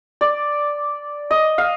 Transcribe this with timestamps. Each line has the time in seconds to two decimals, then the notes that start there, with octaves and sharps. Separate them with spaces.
0.21 D5
1.31 D#5
1.58 F5